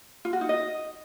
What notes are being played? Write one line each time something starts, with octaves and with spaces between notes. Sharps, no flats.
F4
F#4
D#4
D#5